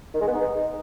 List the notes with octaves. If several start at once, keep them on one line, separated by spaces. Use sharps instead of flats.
D#3
G#3
B3
D#4